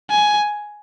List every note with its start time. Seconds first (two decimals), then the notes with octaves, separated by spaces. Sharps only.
0.10 G#5